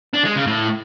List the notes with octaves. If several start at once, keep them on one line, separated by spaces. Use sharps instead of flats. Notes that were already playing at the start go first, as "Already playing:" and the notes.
D4
G#3
C#3
A2